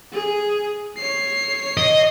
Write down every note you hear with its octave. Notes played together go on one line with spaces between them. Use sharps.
G#4
C#5 C7
D#5